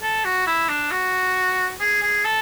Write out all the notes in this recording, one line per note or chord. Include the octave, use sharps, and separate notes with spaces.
A4
F#4
E4
D4
F#4
G#4
G#4
A4